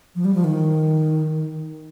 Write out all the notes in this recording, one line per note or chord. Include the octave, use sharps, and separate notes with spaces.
F3
G3
F3
D#3